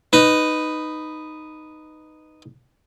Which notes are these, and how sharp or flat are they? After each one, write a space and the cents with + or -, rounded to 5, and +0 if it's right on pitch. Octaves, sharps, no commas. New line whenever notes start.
D#4 -5 B4 +5